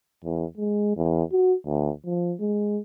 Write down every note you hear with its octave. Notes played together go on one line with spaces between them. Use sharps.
E2
G#3
E2
F#4
D2
F3
G#3